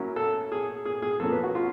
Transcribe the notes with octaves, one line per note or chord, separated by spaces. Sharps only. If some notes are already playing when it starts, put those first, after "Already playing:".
Already playing: F#3 A#3 C#4 E4
A4
G#4
G#4
G#4
F3 A#3 C#4 A4
B4
F#4
F4